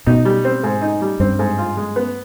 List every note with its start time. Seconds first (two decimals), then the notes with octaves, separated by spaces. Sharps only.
0.06 B2 D#4
0.25 G3
0.45 C4
0.63 G#2
0.82 D#4
1.02 G3
1.20 G2 C4
1.39 G#2
1.58 F4
1.77 G#3
1.96 B3